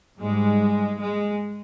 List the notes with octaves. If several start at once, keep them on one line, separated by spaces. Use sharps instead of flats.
G#2 G3 G#3
G#3